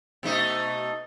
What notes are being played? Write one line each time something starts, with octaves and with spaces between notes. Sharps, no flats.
B2 A3 D#4